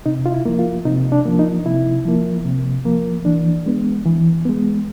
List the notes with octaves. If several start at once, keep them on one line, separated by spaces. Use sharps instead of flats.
C3 D#4
F4
E4
F3 A#3
F4
C3 D#4
D4
F3 A#3
D#4
C3 E4
F3 A#3
C3
F3 A#3
E3 D4
G#3 B3
E3
G#3 B3